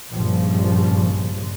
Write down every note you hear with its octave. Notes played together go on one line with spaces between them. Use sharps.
A#1 G2 C#3 F3